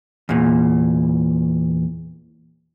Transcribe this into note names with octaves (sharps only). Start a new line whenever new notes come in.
E2 A#2